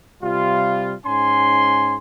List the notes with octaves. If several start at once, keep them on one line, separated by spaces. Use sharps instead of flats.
C3 G3 F4
G#2 C#4 G#5 C6